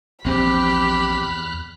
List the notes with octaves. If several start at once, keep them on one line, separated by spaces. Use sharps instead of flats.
A#1 E2 C4 G4 B5 F6 F#6